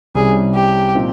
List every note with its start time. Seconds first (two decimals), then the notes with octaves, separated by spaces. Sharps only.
0.15 C2 C3 G3 C#4 G#4
0.55 G4
0.95 A#2 F3 C4 D#4